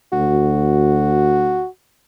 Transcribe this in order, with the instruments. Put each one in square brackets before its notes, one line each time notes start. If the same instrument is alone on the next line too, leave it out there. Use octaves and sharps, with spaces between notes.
[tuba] D2 [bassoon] F#4